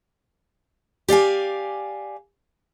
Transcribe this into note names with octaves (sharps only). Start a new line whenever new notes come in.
G4 D5 F5 G#5